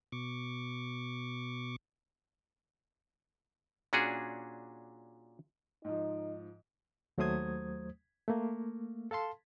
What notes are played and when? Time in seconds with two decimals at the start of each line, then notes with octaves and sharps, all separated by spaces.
0.12 B2 C#6 D6
3.93 A#2 C#4 D4 F#4 G#4
5.85 G#2 F3 D#4
7.18 D#2 F#3 A3 C5 D#6 G#6
8.28 A3 A#3
9.11 A4 F5 A5 C6